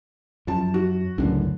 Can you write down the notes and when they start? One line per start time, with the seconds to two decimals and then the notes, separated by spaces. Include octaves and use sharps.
0.47 F#2 F3 A5
0.74 F#4
1.18 C#2 F#2 A2 D3